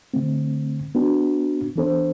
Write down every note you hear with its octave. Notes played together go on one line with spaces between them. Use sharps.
D3 A3 C4
B3 D4 F#4
E3 B3 D4 A4 C5